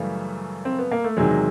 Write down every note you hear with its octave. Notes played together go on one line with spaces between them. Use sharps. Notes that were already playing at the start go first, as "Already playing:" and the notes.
Already playing: F#2 C#3 E3 G3 A3
C4
B3
A#3
A3
E2 C3 D#3 F#3 G#3